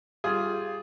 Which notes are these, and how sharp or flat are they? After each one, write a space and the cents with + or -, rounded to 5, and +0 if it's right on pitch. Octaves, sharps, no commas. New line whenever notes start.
G3 +0 F4 +0 G#4 +10